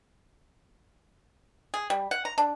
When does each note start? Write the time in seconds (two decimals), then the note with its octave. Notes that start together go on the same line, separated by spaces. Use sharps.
1.74 G#4
1.90 G3
2.11 F#5
2.25 A#5
2.38 D4